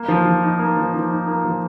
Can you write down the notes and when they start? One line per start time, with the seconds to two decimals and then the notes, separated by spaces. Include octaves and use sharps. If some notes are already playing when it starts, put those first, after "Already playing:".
Already playing: A#3
0.08 F3
0.25 F3
0.43 D#4
0.59 A#3
0.77 F3
0.94 F3
1.11 D#4
1.28 A#3
1.44 F3